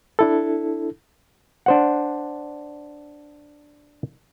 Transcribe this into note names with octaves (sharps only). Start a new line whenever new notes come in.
D4 E4 A4
D4 C5 F#5